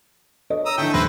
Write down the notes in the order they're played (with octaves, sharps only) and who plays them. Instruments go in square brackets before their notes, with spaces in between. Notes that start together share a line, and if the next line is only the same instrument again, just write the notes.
[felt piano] A4 C#5 D#5
[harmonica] A#5 D#6 E6
[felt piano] D3 E3 [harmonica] A3 G5
[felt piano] D#1 D#4 A#6 [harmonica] E4 B4 C5